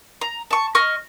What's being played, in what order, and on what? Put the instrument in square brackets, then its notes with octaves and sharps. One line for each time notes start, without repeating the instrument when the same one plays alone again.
[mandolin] A#5
A5 C#6
D#5 C#6 F6